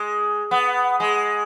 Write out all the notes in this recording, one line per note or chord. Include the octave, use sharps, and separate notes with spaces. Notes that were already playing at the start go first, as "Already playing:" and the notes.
Already playing: G#3
B3
G#3